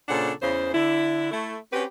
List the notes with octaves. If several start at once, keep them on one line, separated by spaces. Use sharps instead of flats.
A#2 C#3 D4 A4 C5 F#5
E2 C#3 C5
D3 D4 E4
A3 E4
C4 C#4 F#4 G4 B4